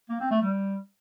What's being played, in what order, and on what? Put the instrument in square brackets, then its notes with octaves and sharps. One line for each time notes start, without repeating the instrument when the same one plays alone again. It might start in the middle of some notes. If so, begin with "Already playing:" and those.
[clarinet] A#3
C4
A3
G3